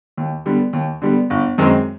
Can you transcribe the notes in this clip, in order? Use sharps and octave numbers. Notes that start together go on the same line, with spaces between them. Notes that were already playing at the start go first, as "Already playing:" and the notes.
D#2
D3 G3 B3
D#2
D3 G3 B3
G1
F#2 D#3 G#3 C4